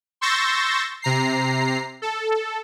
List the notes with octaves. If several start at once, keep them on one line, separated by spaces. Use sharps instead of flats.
C6 C#6 E6 G6 A6 A#6
C3 A#5 C7
A4